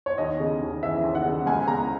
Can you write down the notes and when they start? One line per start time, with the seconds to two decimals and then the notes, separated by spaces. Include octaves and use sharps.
0.06 C#5
0.18 D#2 D#5
0.40 C#3
0.61 D#2
0.83 E3 E5
1.03 D#2
1.15 F#5
1.26 C#3
1.46 C#2 G#5
1.67 C#3 A#5